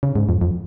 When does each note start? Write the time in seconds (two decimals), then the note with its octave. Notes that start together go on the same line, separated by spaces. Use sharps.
0.03 C#3
0.16 G#2
0.29 F2
0.41 F2